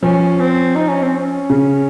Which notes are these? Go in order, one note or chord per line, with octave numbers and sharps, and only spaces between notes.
F3 C#4
C4
D#4
C#4
C4
C#4
C#3